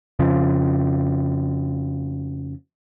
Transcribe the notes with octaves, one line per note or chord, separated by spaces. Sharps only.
F2 C#3 F3